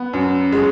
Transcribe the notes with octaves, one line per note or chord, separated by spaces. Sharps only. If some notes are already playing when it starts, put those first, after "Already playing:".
Already playing: B3
F#2
G#3